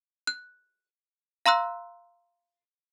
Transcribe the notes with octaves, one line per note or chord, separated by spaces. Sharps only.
F#6
F5 A#5 C6 E6 F#6